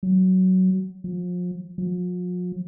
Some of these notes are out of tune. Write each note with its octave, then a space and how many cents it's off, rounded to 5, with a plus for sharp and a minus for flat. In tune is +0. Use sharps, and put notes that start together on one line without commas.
F#3 +10
F3 +35
F3 +45